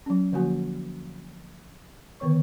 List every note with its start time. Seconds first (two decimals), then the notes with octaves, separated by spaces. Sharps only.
0.06 F#3 C#4
0.32 D3 F3 A#3 F#4 G#5
2.20 D3 D#3 B3 C#5 C#6